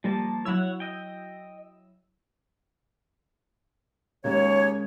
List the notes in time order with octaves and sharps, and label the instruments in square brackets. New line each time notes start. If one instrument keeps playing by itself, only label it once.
[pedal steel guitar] F3 A#3 A5 [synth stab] G3
[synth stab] F#3 E4 E6 [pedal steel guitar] C#5 F#5
[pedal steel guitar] D#5 G5
[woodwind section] D#2 C#5 [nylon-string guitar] C#3 G#3